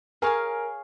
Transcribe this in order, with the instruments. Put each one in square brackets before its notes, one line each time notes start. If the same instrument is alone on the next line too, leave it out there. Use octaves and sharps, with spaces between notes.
[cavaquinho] G#4 C#5 F5 G#5 [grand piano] A#4